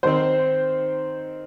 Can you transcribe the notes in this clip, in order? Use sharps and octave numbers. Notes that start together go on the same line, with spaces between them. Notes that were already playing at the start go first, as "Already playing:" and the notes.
D#3 C4 C5